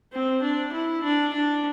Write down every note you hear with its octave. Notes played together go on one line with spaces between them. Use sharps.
C4
D4
E4
D4
D4